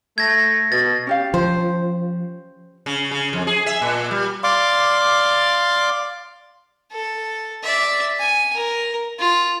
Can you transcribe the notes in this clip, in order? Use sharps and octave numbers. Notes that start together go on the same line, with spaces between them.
A3 G#6 A#6
B2 A6
C#4 G4 F5
F3 C5
C#3
C#3
F2
G#4
E5
A#2
G3
D5 F5 C6 D6
A4
D5 E5
G#5
A#4
F4